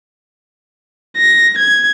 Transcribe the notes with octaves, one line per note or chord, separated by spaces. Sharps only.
A#6
G#6